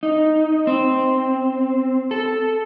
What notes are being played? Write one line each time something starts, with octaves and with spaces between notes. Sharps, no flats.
D#4
C4
A4